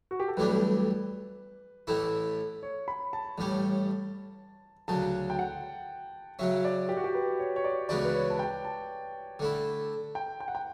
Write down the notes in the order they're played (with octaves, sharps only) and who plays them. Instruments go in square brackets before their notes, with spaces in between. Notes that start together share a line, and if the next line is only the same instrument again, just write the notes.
[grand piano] F#4
G4
A4
[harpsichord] B1 A2 E3 G3 D4 [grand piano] B4
[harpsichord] A1 A2 E3 A3 E4
[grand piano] C#5
B5
A5
[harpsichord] A1 A2 G3 C#4
[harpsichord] D2 C#3 F#3 [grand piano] A5
[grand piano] G5
F#5
[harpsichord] C#3 F#3 C#4 [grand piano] E5
[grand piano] D5
G4
F#4
G4
B4
C#5
C#5
D5
[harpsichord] C#2 C#3 E3 B3 F#4 [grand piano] D5
[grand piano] B4
C#5
A5
G5
A5
[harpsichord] D3 A3 E4
[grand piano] G5
G5
F#5
G5